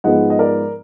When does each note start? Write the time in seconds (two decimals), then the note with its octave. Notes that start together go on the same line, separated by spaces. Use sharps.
0.04 G#2 F3 G#3 B3 D#5 F#5
0.30 D#5
0.39 A#4 D5